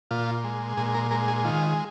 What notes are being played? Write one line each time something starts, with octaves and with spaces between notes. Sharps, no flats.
A#2 F4
G#3
A#2 G#4
A#4
G#3 A#4
G#4
D#3 F4